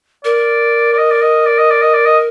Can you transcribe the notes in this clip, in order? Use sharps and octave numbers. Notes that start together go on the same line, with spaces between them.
A#4 D5
D5
D#5
D5
D#5
D5
D#5
D5
D#5
D5
D#5